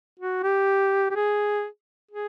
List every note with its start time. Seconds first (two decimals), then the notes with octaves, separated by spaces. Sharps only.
0.19 F#4
0.43 G4
1.10 G4
1.16 G#4
2.11 G#4